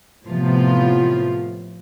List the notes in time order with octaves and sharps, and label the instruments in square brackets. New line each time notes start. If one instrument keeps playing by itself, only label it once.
[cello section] A2 C3 F3 B3 F4